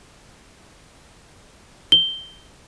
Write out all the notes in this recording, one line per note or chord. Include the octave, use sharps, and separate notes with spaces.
G7